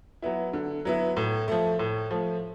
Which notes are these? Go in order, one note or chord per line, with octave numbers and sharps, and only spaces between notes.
F#3 B3 E4
D3
F#3 B3 E4
A2
F3 A3
A2
F3 A3